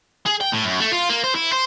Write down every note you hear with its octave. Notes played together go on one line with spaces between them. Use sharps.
G#4
G5
A2
F#2
A3
F4
A#3
C5
E4
C5